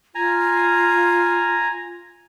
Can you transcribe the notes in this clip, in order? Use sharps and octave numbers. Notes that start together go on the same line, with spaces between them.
F4 G#5 A#5